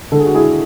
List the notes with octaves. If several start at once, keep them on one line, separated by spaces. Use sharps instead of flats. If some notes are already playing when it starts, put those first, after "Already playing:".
D3 A4
G#4
F#4
E4 G#4